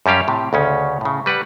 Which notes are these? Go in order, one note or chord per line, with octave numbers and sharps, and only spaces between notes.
F#2 G3 C#4 G4 F5
A2 C3
D2 C#3 C#4
A2 C#3
G3 B4 D5 F#5